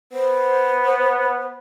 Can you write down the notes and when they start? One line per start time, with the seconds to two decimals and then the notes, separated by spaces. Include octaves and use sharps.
0.12 B3 C5